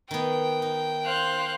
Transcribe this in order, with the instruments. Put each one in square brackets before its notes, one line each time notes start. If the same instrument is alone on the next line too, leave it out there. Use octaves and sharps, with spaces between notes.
[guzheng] D#3 B3 [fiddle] G5
[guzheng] D#4
[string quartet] C5 F5 F#6